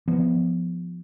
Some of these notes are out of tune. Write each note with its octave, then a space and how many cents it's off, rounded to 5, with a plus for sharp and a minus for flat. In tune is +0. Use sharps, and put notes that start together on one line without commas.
F3 +0 B3 +0